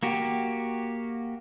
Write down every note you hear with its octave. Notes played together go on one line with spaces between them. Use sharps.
A#3 F#4 G4